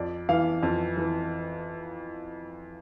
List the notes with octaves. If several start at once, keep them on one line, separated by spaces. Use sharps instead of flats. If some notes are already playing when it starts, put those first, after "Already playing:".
Already playing: F2 D5
E3 F5
F2
E3